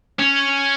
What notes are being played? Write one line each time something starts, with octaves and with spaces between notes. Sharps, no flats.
C#4